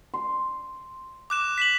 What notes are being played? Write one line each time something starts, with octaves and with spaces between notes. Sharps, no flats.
C6
D6 F#6 E7
B6 E7 F#7